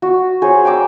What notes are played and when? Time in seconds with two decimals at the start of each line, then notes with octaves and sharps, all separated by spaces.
0.02 F#4
0.42 G#4 C5 C#5
0.65 G5 A#5 D6 E6